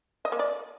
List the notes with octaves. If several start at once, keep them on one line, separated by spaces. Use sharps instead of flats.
D#5
A#3
D5